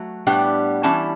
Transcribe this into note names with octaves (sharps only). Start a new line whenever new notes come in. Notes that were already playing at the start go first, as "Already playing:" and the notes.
Already playing: F#3 A3
A2 G3 B3 D4 G5
E3 G3 C#4 E4 A5